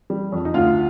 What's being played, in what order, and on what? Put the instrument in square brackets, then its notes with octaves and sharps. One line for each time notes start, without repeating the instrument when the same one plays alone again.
[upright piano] G3
F2
D#4
D2 F4